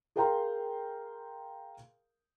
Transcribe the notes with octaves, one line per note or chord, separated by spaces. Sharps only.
G#4 A#4 F5 G5 A#5 C6